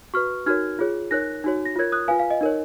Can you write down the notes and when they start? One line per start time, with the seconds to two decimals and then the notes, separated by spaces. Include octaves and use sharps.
0.14 F#4 B4 C#6 F6
0.46 D#4 F#4 A#4 C#5 F6 G#6
0.79 F4 G#4 C#5
1.11 D#4 A#4 C#5 F#6 A#6
1.44 D#4 F#4 C#5
1.65 A#6
1.76 F4 A#4 C#5 G#6
1.92 D#6 F#6
2.08 F4 B4 F5 G#5
2.19 F5
2.30 D#5
2.41 D#4 A#4 C#5